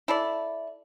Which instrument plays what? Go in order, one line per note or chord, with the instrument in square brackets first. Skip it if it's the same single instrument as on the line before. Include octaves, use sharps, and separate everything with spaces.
[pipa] E4 A4 D5